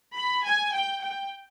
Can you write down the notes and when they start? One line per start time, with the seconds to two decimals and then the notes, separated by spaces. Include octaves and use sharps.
0.15 B5
0.45 G#5
0.74 G5
1.02 G5